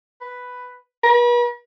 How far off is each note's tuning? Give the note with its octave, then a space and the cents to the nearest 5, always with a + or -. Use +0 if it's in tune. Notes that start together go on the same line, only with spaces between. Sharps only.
B4 +5
B4 -40